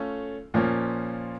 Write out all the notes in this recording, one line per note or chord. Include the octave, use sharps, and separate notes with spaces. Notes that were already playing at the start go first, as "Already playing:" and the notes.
Already playing: A3 C#4 F4 A4
A#2 F3 A#3 C#4